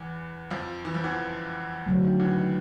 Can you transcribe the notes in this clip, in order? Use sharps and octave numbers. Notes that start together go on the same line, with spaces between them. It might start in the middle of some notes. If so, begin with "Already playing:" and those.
Already playing: E2 E3
F2 F3
E3
F3
E2 E3
D3 F#3 A3
D#3
E2 E3
D#3